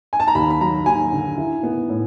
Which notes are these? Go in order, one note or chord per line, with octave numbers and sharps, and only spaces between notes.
G#5
A5
A#5
D#2 B5
B5
F#3 A#5
D#2 G#5
D3
E4
B3
A2